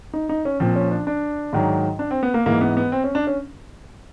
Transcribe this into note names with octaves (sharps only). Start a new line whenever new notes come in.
D#4
D#4
C#4
A#2 F3 C4
C#4
D4
D4
G#2 D#3 F#3
D4
C4
B3
A#3
G#2 E3 A#3
B3
B3
C4
C#4
D4
C#4